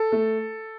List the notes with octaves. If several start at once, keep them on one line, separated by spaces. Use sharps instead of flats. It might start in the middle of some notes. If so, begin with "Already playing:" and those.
Already playing: A4
A3